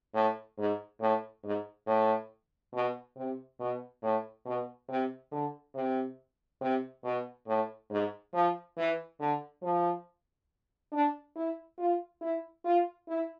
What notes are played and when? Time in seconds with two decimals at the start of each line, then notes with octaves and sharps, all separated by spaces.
0.14 A2
0.58 G#2
1.00 A2
1.43 G#2
1.87 A2
2.73 B2
3.16 C3
3.60 B2
4.02 A2
4.46 B2
4.89 C3
5.32 D3
5.75 C3
6.61 C3
7.04 B2
7.47 A2
7.90 G#2
8.33 F3
8.77 E3
9.20 D3
9.62 F3
10.92 D4
11.36 E4
11.79 F4
12.21 E4
12.65 F4
13.08 E4